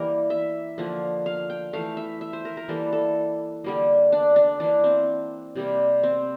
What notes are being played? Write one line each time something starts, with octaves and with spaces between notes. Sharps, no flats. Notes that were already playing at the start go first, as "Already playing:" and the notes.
Already playing: E3 G3 A#3 A#4
E5
D3 F3 A#3
F5
G5
E3 A3 F5
E5
E5
C5
A#4
A#4
E3 G3 A#3 A4
A4
D3 G3 A#3
D4
D4
E3 A#3 D4
C4
C3 G3 A#3
C4